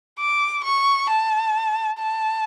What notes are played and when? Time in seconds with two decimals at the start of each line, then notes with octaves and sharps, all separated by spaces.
0.20 D6
0.64 C#6
1.09 A5
1.99 A5